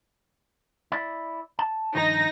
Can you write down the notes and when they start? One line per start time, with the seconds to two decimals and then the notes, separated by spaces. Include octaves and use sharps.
0.92 E4 D5
1.59 A5
1.95 G2 D#3 F3 D#4 A#6